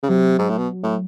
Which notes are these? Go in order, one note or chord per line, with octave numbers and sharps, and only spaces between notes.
C#3
C3 F#3
G#2
A2
B2
A2